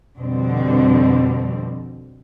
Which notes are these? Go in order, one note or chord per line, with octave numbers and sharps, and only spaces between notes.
F2 B2 D3 G3 C4